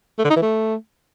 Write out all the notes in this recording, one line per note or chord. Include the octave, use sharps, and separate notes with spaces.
A3
D3
D#4
E3
A3